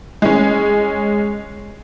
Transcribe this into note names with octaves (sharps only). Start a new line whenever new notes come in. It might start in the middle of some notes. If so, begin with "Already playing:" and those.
G#3 C#4